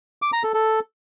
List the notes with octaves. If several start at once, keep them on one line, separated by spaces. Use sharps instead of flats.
D6
A#5
A4
A4